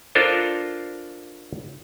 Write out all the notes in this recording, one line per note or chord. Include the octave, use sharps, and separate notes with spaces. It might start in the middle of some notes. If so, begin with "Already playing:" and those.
D4 F4 A4 A#4 C5